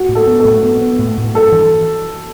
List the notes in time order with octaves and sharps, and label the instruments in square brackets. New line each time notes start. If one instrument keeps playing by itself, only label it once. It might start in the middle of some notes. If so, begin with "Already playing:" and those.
Already playing: [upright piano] F#4
[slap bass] A2
[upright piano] A4
[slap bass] B3
[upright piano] A4
[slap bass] A2
B3
B3
A2
A2
[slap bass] G2 [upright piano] A4
[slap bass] E3